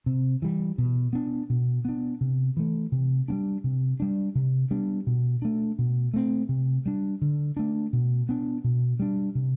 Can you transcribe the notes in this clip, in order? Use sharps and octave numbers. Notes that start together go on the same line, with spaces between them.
C3
E3 G3
B2
B3 D4
B2
B3 D4
C3
E3 A3
C3
G3 B3 D4
C3
G3 D4
C3
G3 B3 D4
B2
A3 D4
B2
A3 C4
C3
G3 D4
D3
A3 D4
B2
B3 D4
B2
G3 D4
C3